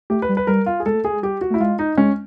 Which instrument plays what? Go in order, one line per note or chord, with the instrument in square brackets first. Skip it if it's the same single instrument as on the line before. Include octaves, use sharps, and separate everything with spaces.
[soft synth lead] A3 [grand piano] G4
[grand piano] B4
[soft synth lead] G3
[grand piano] B4
[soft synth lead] G3 [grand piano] A#4
[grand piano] F4
G#4
[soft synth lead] G#3 [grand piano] A4
[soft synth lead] A3
[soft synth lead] A3 [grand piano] G#4
[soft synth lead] G#3
[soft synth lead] G3 [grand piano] G4
[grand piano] F#4
[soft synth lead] A3
[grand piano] E4
[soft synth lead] G#3 [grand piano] F4
[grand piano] D#4
[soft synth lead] G#3 [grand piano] C#4